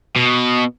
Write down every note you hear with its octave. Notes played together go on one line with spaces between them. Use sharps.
B2